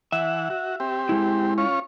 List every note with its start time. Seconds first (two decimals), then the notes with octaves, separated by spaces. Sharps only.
0.12 E3 E5 F#5
0.50 F#4
0.80 C4 G4
1.09 G#3 E4
1.58 C#4 F4 C#5